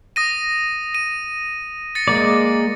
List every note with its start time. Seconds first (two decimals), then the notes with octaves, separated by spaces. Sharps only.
0.16 D#6 A#6 D#7
0.95 D#7
1.95 A6 A#6 C#7
2.08 G#3 A#3 D5